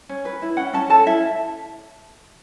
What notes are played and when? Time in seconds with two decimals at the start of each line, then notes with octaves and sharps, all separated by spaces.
0.09 C#4
0.25 B4
0.42 E4
0.57 C#4 F#5
0.73 C#4 A5
0.90 A4 A5
1.06 E4 E5